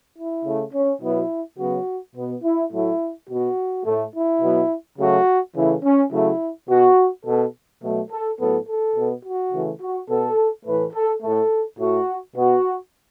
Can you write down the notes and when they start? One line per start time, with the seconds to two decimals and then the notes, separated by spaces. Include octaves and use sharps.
0.16 E4
0.45 C#3 A3
0.72 C#4
1.01 B2 F#3 B3 E4
1.58 C#3 F#3 B3 F#4
2.15 B2 B3
2.43 E4
2.71 A2 F#3 A3 E4
3.28 B2 B3 F#4
3.85 A2 A3
4.13 E4
4.42 B2 F#3 B3
4.98 C#3 F#3 A3 F#4
5.55 C#3 E3 A3 E4
5.83 C#4
6.11 C#3 F#3 A3 E4
6.68 B2 B3 F#4
7.25 B2 B3 A4
7.81 B2 F#3 A3
8.11 A4
8.38 A2 F#3 B3 A4
8.67 A4
8.95 B2 B3
9.23 F#4
9.52 C#3 E3 A3
9.80 F#4
10.08 B2 B3 A4
10.65 A2 E3 A3 B4
10.93 A4
11.21 A2 A3 A4
11.78 A2 A3 F#4
12.35 B2 B3 F#4